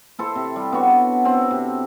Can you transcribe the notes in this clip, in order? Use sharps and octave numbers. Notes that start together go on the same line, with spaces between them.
E4 A4 C5
C3
G3
B3 D4 F#4 C#5
C4
C3